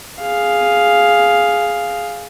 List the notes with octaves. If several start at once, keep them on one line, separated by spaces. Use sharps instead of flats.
G#4 F5